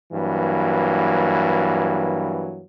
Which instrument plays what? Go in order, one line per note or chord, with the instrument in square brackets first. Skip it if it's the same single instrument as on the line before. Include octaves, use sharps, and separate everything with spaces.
[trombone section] G2 E3 F#3 A#3